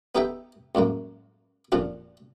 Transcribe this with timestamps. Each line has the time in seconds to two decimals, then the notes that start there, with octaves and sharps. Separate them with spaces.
0.15 B3 D#4 G4 A4 E5 G5
0.75 C#2 F#2 A2 A#3
1.72 F2 A#2 D4 F4